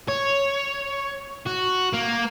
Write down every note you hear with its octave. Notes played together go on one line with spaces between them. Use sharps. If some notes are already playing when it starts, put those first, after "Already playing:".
C#5
F#4
A#3